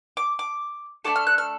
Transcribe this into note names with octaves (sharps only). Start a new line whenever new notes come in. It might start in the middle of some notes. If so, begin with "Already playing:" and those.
D6
D6
A3 D4 F#4 A4 D6
F6
F#6
F6